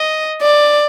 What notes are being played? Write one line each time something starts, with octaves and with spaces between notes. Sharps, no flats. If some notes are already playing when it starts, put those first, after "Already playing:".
Already playing: D#5
D5